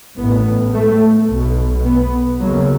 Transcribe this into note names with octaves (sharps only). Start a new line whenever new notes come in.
A1 A2 B3
A3
B1 B2
B3
D#2 C#3 F#3